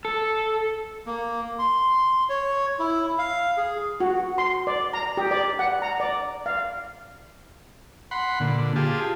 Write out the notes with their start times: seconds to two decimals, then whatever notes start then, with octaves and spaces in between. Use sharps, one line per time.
0.05 A4
1.06 A#3
1.59 C6
2.29 C#5
2.79 E4
3.18 F5
3.57 G#4
4.00 F#4
4.38 C6
4.67 D5
4.93 A#5
5.17 G4
5.31 D5
5.59 F#5
5.82 A#5
6.00 D5
6.46 F5
8.11 F#5 B5 C6
8.40 A#2 D3
8.76 F4 G4 G#4 A5